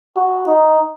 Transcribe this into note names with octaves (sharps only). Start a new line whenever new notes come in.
F#4
D#4